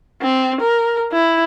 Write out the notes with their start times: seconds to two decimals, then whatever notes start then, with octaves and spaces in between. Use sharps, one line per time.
0.22 C4
0.61 A#4
1.12 E4